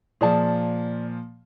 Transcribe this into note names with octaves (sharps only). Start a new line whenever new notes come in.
A#2 F3 G#4 D5 A5